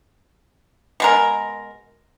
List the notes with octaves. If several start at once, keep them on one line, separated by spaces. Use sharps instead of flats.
B2 G#3 A#4